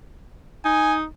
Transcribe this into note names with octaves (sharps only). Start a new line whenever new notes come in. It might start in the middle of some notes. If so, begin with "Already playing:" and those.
D#4 G#5